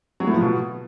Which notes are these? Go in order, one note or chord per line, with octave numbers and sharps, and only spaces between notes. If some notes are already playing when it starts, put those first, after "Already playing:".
F#3
A2
F3
B2